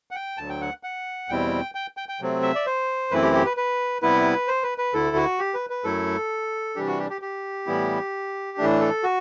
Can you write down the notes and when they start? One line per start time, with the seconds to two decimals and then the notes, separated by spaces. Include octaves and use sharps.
0.11 F#5
0.15 G5
0.38 D2 D3 F#3 A5
0.49 G5
0.61 F#5
0.83 F#5
1.29 E2 B2 G3 C4 E4 G5
1.75 G5
1.97 G5
2.09 G5
2.21 C3 F#3 A3 C4
2.42 E5
2.55 D5
2.66 C5
3.11 F#2 E3 A3 C4 E4 B4
3.22 G4
3.34 G4
3.45 B4
3.57 B4
4.02 C3 G3 B3 E4 B4
4.48 C5
4.63 B4
4.78 B4
4.93 D2 D3 A3 E4 A4
5.16 F#4
5.39 G4
5.54 B4
5.70 B4
5.84 F#2 F#3 A3 E4 A4
6.76 C3 E3 G3 D4 G4
6.87 F#4
6.99 G4
7.10 G4
7.22 G4
7.67 A2 E3 G3 B3 E4
8.58 A2 E3 A3 D4
8.81 A4
9.03 F#4